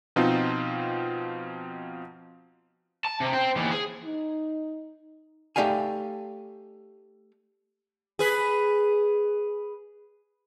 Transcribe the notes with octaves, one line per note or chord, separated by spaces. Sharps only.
B2 F3 C4 D#4 F4
A5
C3
C5 G5
D#2 E3
G#4
D#4
A3 D#4 G4 D5 F5 G#5
G#4 B4